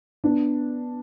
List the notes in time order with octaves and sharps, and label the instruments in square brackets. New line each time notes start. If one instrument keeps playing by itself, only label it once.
[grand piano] B3 D4